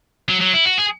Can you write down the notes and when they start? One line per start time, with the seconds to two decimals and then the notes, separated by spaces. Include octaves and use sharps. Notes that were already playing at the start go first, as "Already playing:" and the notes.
0.29 F#3
0.41 F#3
0.54 E4
0.65 F#4
0.78 G#4